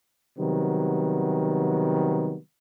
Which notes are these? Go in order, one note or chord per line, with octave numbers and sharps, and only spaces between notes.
C3 D#3 F#3 G3 B3